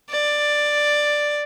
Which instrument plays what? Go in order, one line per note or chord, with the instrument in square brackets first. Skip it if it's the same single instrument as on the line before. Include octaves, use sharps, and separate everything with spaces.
[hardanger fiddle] D5